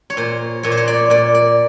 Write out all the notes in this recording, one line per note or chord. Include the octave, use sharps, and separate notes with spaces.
C#5
A#2 C5
A#2 C#5
C5
C#5
D5
A#2 D5
D5